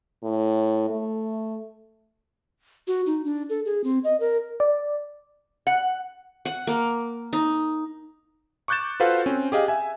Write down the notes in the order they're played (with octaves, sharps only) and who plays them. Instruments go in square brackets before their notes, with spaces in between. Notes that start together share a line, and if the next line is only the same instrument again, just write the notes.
[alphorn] A2
A3
[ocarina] F#4
D#4
D4
A4
G#4
C4
D#5
A#4
[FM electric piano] D5
[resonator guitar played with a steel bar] F#5
[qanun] F#5
A#3
D#4
[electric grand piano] C#6 D6 F#6 G6 A6 E7
F4 F#4 A4 B4 C5 F5
C4 C#4
G4 G#4 D#5 F5 G5
E5 G#5